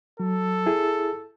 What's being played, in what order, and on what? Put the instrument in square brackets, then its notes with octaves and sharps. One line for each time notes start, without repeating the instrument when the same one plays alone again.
[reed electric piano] F#3 [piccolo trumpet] A4
[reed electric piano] E4 G#4